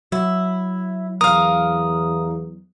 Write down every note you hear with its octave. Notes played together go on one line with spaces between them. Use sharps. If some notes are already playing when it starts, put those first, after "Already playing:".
F#3 E4
E2 A#4 F5 D#6